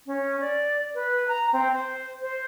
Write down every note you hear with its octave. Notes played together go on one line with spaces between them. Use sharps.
C#4
D5
B4
A#5
C4
C5
C5